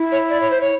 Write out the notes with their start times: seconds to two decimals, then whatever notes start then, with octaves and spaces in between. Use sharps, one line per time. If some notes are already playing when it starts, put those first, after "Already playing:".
Already playing: E4
0.12 C#5
0.30 D5
0.41 C#5
0.50 C5
0.61 C#5